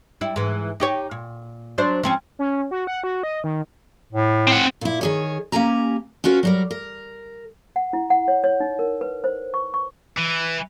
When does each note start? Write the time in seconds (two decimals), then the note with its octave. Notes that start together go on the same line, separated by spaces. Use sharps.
0.21 G3 E4
0.36 G#2 E3
0.80 D#4 G4 C#5
1.11 A#2
1.78 F#3 D4 C5
2.03 F3 C4 C#4
2.39 C#4
2.71 F#4
2.87 F#5
3.04 F#4
3.23 D#5
3.44 D#3
4.13 A2
4.48 C4 F#5
4.81 A#2 E4
5.01 D#3 G#4 C#5
5.52 A#3 C#4 G4 G#5 A#5
6.24 C#4 F4 F#4 A#4 C5
6.43 F#3 G3 A#4
6.71 A#4
7.76 F#5
7.93 E4
8.10 F#5
8.28 C#5
8.44 C#5
8.60 D#4
8.79 A#4
9.01 B4
9.24 C5
9.54 C#6
9.74 C#6
10.17 E3